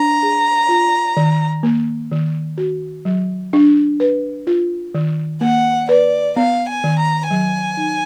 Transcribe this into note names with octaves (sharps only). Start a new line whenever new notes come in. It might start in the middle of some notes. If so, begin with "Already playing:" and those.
Already playing: D4 A#5
G#4
F4
D#3
A#3
D#3
F#4
F#3
D4
B4
F4
D#3
A#3 F#5
B4 D5
B3 F5
G#5
D#3
A#5
F#3 G#5
D#4